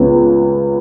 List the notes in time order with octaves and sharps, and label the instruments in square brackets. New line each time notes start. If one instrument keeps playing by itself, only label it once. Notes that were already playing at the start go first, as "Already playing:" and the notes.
Already playing: [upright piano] C#2 C#3 B3